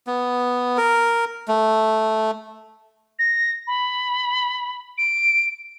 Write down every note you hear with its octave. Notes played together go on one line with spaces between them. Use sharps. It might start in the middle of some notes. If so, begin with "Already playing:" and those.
B3
A#4
A3
A#6
B5
D7